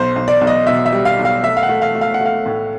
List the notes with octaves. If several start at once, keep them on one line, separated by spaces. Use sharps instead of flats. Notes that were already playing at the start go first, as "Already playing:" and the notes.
Already playing: B1 C5
B1
D5
B1
D#5
B2 E5
E5
G3
F5
B1
F5
A3 E5
F5
F#5
A3
F5
A3
F5
F#5
A3 F5
A2